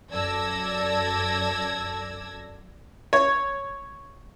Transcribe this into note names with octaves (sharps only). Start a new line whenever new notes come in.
F#2 A4 D5 E6 G#6 A#6
C#5